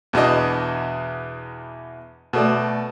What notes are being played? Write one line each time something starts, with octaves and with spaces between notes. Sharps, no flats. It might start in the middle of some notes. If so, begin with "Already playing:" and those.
E2 B2 D4 D#5
B2 A3 D5